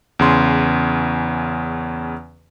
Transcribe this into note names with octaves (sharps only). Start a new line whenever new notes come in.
E2 C#3 C6